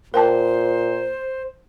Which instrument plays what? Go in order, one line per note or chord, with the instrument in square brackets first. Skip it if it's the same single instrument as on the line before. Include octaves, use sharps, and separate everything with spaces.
[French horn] A#2 [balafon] A#4 G5 A5 [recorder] C5